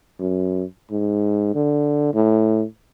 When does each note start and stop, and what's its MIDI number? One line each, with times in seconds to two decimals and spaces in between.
0.19 0.64 42
0.91 1.55 44
1.55 2.11 50
2.14 2.64 45